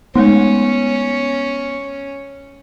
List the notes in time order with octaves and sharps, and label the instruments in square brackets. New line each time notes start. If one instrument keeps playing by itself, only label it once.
[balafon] G#3 A3 D#4 [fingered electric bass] B3 [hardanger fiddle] C#4